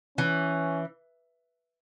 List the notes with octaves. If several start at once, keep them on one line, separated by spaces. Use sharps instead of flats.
E3 C#4